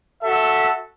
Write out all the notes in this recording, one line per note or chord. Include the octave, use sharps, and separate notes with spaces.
F#4 A4 E5